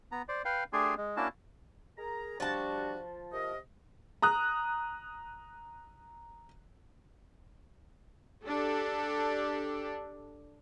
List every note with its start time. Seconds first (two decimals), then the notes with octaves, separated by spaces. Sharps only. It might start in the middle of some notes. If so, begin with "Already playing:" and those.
0.12 B3 A#5
0.29 C5 D5
0.45 B4 F5 G5
0.73 A3 D4 G4 G#4 G#5 C6
0.98 G#3
1.17 A#3 C#4 D4 E4 F#4 A5
1.98 G#4 A#4 A#5
2.40 F3 G3 D4 F#4 A5
3.32 C3 A#4 D#5
4.22 A#5 D#6 F#6
8.46 D4 G4 A4